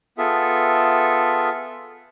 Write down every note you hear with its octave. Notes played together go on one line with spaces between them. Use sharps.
B3 F4 G#4 A4 E5